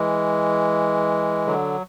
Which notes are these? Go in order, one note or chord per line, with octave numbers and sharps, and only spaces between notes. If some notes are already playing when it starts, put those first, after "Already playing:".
Already playing: E3 G#3
D3 F#3